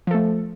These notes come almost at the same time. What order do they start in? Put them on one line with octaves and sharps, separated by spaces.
F3 A4 A3